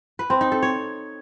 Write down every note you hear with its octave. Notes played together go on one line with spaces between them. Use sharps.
B4
C4
D#4
A4
C#5